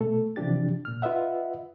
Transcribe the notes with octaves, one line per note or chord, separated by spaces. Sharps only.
B2 A3 A4
C3 E3 F3 D4 G4 A6
A#2 F6
F4 B4 D#5 E5 F#5